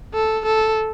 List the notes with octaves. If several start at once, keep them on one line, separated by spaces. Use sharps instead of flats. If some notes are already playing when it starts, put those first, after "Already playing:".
A4
A4